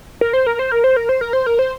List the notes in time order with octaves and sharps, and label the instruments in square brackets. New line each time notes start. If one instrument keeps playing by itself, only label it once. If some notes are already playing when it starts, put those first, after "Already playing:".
[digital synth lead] A#4
C5
A#4
C5
A#4
C5
A#4
C5
A#4
C5
A#4
C5